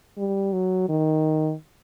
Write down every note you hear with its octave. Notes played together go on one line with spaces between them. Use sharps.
G3
F#3
D#3